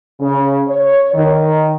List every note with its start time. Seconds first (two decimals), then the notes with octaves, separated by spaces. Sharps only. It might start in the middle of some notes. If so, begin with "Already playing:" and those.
0.20 C#3
0.68 C#5
1.15 D#3